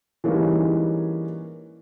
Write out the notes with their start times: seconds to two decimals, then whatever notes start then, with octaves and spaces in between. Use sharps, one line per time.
0.24 E3 G3 G#3 A#3 C#4 D#4